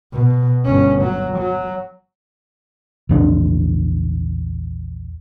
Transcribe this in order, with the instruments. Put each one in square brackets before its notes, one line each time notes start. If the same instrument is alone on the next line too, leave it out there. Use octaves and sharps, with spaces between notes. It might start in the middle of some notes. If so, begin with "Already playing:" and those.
[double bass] B2
G1 C#4
F#3
F#3
[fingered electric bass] A#1 E2 D4